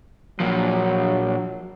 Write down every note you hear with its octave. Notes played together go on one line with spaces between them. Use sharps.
A#2 F3 F#3